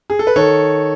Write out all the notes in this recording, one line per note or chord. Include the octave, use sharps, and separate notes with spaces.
G#4
A4
B4
D#3 A4 C#5